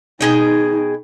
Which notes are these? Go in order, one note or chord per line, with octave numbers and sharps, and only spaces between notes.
B2 D#4 G#4 G5